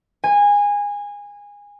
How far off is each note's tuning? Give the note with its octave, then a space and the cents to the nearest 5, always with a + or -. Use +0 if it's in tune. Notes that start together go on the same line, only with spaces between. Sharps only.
G#5 -20